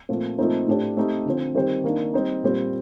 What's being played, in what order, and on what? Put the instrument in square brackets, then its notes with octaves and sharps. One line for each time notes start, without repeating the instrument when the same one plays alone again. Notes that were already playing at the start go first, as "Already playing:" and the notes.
[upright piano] A#2 F3 A3 C4 F4
A#2 F3 A3 C4 D#4
A2 A3 D4 G4 C5
A3 C4 D#4 G4
D3 F3 C4
D#3 G3 C4 G4 C5
D#3 A#3 D4
G3 C4 D#4
A#2 G3 C4